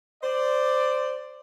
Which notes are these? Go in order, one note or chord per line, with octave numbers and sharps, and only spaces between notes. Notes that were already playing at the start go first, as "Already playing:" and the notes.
C5 D5